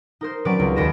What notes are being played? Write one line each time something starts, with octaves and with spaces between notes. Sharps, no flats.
D#4 A#4 C5
F#3 C4 C#4 B4 D5 D7
C#2
D#2 B4 D#5 A#6 D7 E7